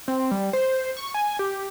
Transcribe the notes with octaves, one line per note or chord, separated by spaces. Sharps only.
C4
G3
C5
C#6
G#5
G4